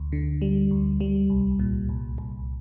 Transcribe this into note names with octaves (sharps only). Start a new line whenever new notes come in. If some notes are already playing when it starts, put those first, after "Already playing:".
Already playing: D2
D3
G3
D2
G3
C2
A#2
C2
C2